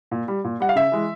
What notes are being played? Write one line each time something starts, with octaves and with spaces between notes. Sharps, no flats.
A#2
G3
A#2
G3 F#5
F5
C#3 E5
E3 G#3